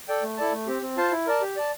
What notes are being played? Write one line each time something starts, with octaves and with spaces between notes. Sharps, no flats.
A4 D5 G5
A3
E4 A4 D5 A5
A3
C4 G4
C4
F4 C5 F5 A5
E4
A#4 D5 A5
G4
D5 A5